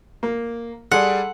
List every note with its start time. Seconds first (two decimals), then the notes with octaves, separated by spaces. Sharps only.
0.23 A#3
0.91 G3 G#4 A4 D5 F#5 C6